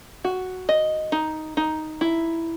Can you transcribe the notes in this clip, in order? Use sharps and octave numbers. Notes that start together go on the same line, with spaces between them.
F#4
D#5
D#4
D#4
E4